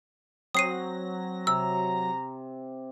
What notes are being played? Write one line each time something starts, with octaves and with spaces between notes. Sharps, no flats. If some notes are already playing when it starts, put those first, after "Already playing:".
F#3 C4 D#6 A#6 C7 D#7
C3 A#5 E6